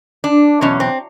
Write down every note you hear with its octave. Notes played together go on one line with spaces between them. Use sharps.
D4
E2 B2 F#3 C#4
C4